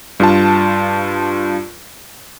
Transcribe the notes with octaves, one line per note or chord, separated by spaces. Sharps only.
G2 F4 A5